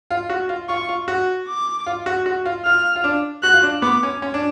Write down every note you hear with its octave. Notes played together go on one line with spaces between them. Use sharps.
F4
F#4
F4
F4 C#6
F4
F#4
D6
F4
F#4
F#4
F4
F4 F6
F4
D4
F#4 F#6
F4
D4
B3 D6
C#4
C#4
D4